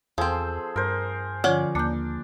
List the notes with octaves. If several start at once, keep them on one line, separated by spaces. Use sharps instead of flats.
E2 F3 C4 G#4 A4 C5
G2 A#4 C5
D3 F3 C#4 F4 D5 F#5
D#2 A#3 D4 G6